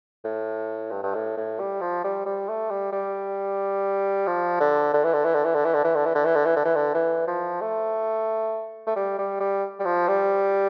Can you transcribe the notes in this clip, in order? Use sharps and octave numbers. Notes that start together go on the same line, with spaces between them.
A2
G2
G2
A2
A2
G3
F3
G3
G3
A3
G3
G3
F3
D3
D3
E3
D3
E3
D3
E3
D3
E3
D3
E3
D3
E3
D3
E3
D3
E3
D3
E3
D3
E3
F3
A3
A3
G3
G3
G3
G3
F3
G3